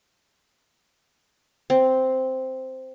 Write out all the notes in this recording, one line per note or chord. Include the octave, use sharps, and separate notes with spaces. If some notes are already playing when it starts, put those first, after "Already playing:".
C4